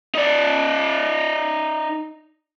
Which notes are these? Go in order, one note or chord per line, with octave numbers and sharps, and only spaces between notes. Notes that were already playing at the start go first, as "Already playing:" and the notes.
D#4 D5